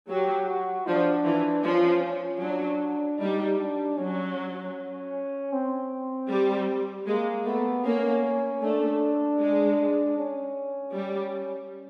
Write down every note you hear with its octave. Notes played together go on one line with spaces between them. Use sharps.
F#3 G4
F#4
F3 D4
E3
F3 C#4
C#4
F#3 D4
G3 D#4
D4
F#3 C#4
C4
G3
G#3 A#3
A3 B3
A#3 C#4
A3 D4
G#3
C#4
G3